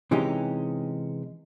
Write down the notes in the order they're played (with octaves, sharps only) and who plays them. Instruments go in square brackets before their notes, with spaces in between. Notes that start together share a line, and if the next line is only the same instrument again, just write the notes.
[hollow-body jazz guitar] C3 E3 G#3 C#4 D#4 G4